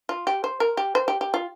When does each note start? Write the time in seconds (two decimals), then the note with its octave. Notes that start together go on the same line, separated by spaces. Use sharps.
0.09 F4
0.27 G4
0.44 C5
0.60 A#4
0.77 G4
0.95 C5
1.08 G4
1.21 G4
1.34 F4